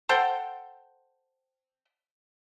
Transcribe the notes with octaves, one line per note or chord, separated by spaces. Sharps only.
A4 C5 F#5 G5